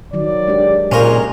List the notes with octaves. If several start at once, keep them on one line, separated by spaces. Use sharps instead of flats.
D#3 F#3 D5
G#3 D4 G4
A#2 G#3 C#4 A#4 C5